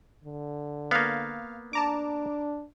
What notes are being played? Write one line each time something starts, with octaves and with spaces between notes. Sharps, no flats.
D3
A#3 B3 F5
D4 A5 A#5 D6